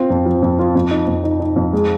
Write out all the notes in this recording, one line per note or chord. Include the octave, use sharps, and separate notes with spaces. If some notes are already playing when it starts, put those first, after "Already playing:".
Already playing: C4 F4
F2
F3
F2
F4
F2
D#4
F2
D#4
D#4
F2
G#3